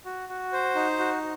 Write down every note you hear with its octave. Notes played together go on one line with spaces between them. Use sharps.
F#4
F#4
C5
D#4
F#4